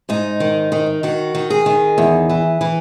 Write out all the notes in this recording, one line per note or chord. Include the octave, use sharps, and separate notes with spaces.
G#2 D#4
D#3
D#3
D#3 F#4
D#3
G#4
D#3
E2
E3
E3